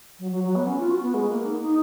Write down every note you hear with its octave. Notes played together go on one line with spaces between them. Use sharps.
F#3
F#3
F#3
B3
C#4
F4
F#4
B3
G#3
A#3
D#4
D#4